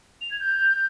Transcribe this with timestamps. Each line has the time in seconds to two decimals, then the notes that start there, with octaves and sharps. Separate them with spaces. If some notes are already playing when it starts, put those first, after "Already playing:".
0.21 F7
0.31 G#6
0.40 G6